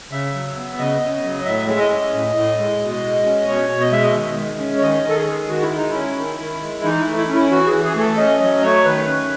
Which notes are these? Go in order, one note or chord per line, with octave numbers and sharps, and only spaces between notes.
C#3 E5
F#3
B3
C#3 D#5
C#3
F#3
A2 E5
G#3 E5
D#5
C#4
A2
A2
G#3
B2
G#3
C#4
B2 C#5
B2
D#5
G#3 E5
D#5
D#3
G#3
C#4
C#5
D#3 D#5
D#3 A4
G#4
G#3
D#3 F#4
E4
G#3
D#4
C#4 E4
D#3
D#3
G#3
E3 D#4
E4
A3
E4
C#4
E4
E3 F#4
G#4
E3
G#4
A3 G#4 A4
C#4 D#5
F#3 D#5
A3 C#5
D#3 B4
C#4